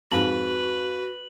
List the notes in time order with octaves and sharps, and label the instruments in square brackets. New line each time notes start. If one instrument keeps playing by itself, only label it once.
[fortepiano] F2 G#2 [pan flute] F#4 [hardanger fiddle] B4 [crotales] F#7